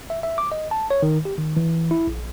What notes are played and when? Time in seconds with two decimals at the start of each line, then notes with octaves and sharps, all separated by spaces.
0.10 E5
0.23 E5
0.38 D6
0.52 D#5
0.71 A5
0.91 C#5
1.03 D#3
1.25 G4
1.38 D#3
1.57 E3
1.91 E4
2.07 A#1